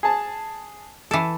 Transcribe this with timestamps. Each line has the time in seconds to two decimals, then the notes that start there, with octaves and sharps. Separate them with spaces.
0.03 G#4 A5
1.11 E3 A4